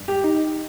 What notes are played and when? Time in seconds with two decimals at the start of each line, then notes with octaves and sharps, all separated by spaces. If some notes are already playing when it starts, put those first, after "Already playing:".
Already playing: G2
0.08 G4
0.24 D#4